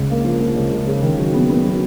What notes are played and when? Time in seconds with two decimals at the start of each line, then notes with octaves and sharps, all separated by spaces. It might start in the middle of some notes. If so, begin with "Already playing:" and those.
Already playing: C#2 C#3
0.10 A#3
0.25 F3
0.41 A#3
0.56 C#2
0.71 C#3
0.87 C#3
1.02 D#3
1.18 F#3
1.34 B3
1.49 B3
1.65 F#3